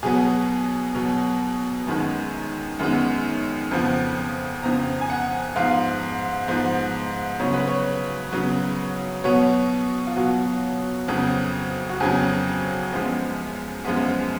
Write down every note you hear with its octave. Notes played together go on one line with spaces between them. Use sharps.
B2 F#3 B3 G#4
B2 F#3 B3
F#2 D#3 G#3 B3
F#2 D#3 G#3 B3
F2 C#3 F3 B3
F2 C#3 F3 B3 A#5
G#5
F#5
G#2 F3 B3 F5
G#2 F3 B3
C#3 F#3 B3 C#5
B4
C#5
C#3 F#3 B3
B2 F#3 B3 C#5
F4
B2 F#3 B3 F#4
F2 C#3 F#3 B3
F#4
F2 C#3 F#3 B3 G#4
F#2 F3 G#3 B3
F#2 F3 G#3 B3